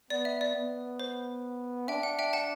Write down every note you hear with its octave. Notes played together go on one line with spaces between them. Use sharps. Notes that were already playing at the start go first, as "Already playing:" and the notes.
B3 D5
E5
D5
B3
C5
D4 E5 G5
F#5
E5 G5
F#5 A5